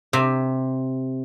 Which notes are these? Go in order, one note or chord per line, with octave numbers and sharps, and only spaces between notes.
C3